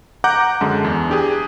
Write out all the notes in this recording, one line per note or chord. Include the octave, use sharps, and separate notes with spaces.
F#5 A#5 D6 F#6 G6
F#2 D3 G#3 A5
E2
D4 G4 G#4